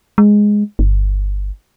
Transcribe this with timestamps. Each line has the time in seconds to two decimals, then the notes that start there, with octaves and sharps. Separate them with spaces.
0.18 G#3
0.79 G1